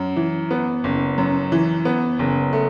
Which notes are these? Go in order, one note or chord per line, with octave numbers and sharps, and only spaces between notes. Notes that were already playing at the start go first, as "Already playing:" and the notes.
Already playing: F#2
E3
B3
F#1
F#2
E3
B3
F#1
A3